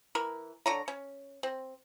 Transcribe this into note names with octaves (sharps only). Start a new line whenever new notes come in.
E3 A#4
D3 C#5 A#5
C#4
C4